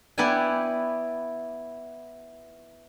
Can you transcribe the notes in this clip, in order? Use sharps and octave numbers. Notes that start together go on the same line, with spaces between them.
B3 E4 B4 D5 G5 G#5